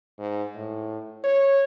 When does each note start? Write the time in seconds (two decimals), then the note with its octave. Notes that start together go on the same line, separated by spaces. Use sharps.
0.19 G#2
0.55 A2
1.24 C#5